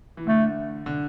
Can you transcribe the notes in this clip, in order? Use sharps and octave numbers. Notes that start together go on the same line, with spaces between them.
E3
D3 A3
D3